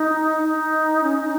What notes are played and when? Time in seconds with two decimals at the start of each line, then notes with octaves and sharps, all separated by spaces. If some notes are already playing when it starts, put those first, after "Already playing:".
Already playing: D#4
0.43 D#4
1.03 C#4
1.23 D#4